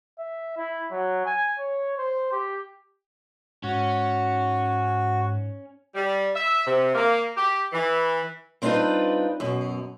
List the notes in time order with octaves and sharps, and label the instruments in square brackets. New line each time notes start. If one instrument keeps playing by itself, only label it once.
[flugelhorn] E5
E4
F#3
G#5
C#5
C5
G4
[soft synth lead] G#2 [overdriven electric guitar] C#4 [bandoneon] F#4
[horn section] G3
E5
C3
A#3
G4
E3
[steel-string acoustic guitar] G3 C4 D4 D#4 F4 B4
F#2 B2